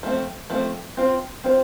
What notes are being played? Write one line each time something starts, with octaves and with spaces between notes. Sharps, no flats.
F3 A3 C4
F3 A3 C4
C4 F4 C5
C4 F4 C5